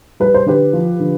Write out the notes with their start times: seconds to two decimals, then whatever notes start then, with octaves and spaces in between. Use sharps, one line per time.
0.20 G3 B4
0.34 C5
0.46 D3 G4 B4
0.73 F3
1.00 D3